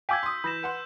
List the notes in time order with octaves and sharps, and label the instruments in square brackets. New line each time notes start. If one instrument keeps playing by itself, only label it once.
[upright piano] F5 G#5 [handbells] G5 D6 G#6 [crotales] E6 G6 B6
[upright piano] C6 D#6
[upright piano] E3 [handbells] B5 A#6 [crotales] G6 E7
[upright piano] B4 F#5 C6